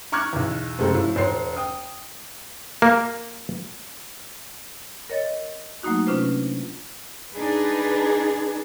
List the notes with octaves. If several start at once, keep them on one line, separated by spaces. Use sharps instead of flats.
A#5 C#6 D6 F6 F#6 G#6
B1 E2
F#1 C3 G#3 A4
A2 F3
E1 C5 C#5 C7
G5 D#6
A#3
A#4 C#5 D#5 A6
F#3 A3 A#3 D#4 F#4
C3 C#4 D4 F4 B4 C5
D4 D#4 G#4 B4